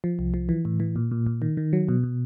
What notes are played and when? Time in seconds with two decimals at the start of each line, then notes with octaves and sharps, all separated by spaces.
0.04 F3
0.19 C2
0.34 F3
0.49 E3
0.65 A2
0.80 E3
0.96 A#2
1.11 A#2
1.27 A#2
1.42 D#3
1.57 D#3
1.73 F#3
1.89 B2
2.03 B2